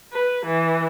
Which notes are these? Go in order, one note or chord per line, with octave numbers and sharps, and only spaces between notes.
B4
E3